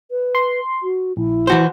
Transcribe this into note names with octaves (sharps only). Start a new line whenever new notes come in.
B4
C6
F#4
A#1 E4
E3 F#4 C5